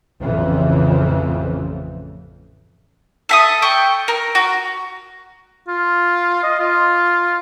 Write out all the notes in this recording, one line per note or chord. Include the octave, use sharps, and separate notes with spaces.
A1 F2 C#3 E3 F3
A4 E5 D#6
G5 C#6
A#4
F#4
F4
D#5
F4